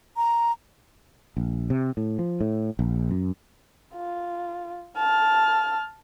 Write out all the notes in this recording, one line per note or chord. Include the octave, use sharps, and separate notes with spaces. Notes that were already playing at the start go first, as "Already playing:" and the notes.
A#5
A#1
C3
A2
F3
A2
A#1
F#2
F4
A5 F6